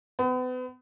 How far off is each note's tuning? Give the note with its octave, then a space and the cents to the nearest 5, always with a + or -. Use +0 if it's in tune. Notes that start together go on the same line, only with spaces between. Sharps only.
B3 +40